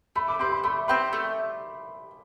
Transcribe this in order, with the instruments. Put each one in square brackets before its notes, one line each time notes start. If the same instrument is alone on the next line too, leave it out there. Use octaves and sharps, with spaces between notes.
[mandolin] A3 [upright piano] B5
[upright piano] D6
[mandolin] C4 G4 B4 [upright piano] C6
[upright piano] B5
[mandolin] A3 [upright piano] B5
[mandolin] C4 G4 B4 [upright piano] C6
[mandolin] A3